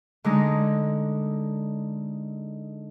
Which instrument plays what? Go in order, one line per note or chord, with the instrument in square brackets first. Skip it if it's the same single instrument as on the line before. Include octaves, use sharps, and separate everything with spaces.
[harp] D3 G#3 D#4